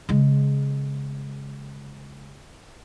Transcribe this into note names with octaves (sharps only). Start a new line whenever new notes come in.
C#3 G#3